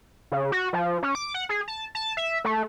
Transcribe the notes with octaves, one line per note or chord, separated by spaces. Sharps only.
C#3
F#4
F3
C#4
D6
F#5
G#4
A5
A5
E5
A3